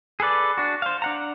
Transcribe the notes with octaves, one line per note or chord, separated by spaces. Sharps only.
G#4 A4 B4 D5
D4 F#4
C5 F5
D4 F#5 A#5